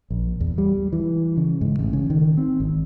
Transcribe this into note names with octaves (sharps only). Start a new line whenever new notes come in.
A#1
E2
G3
E3
C#3
G#2
A1
C#3
D#3
C4
G#1